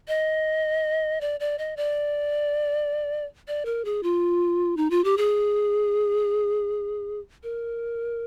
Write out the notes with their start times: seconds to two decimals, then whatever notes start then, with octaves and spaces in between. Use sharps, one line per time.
0.08 D#5
1.21 D5
1.40 D5
1.58 D#5
1.77 D5
3.48 D5
3.65 A#4
3.85 G#4
4.03 F4
4.77 D#4
4.90 F4
5.04 G4
5.17 G#4
7.43 A#4